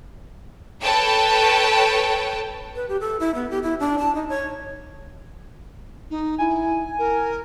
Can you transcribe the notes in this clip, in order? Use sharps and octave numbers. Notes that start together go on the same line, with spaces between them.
A4 B4 C#5 G5 A5
B4
G4
A4
E4
B3
G4
E4
D4
A5
D#4
C#5
D#4
E4 G#5
A#4